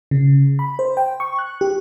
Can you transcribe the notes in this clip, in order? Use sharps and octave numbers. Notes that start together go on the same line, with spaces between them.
C#3
B5
C5
G5
C#6
F#6
G4